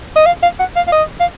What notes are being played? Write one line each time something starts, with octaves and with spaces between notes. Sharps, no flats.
D#5
F5
F5
F#5
F5
F5
D#5
F5